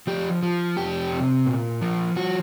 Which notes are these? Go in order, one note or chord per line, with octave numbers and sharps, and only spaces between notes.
F3 G4
F3
F2 G4
C3
A#2
F3
F3 F#4